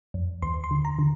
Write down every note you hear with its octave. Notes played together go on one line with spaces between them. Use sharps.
F2
D#2 C6
C6
D3
A#5
D3